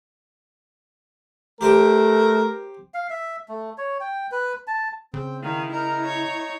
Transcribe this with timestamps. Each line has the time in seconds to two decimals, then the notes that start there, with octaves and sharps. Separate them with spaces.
1.61 A3 G4 A#4 C5 G5
2.94 F5
3.10 E5
3.48 A3
3.78 C#5
4.00 G5
4.32 B4
4.67 A5
5.14 C#3 C4 G5
5.43 D#3 E4 F5
5.72 D#4 A#4 A#5
6.05 C#5